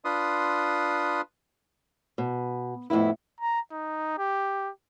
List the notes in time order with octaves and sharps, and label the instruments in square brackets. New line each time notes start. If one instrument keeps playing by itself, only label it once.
[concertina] D4 F4 B4 C6 D#6
[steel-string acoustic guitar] B2
F2 A2 C#3 B3 E4
[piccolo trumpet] A#5
D#4
G4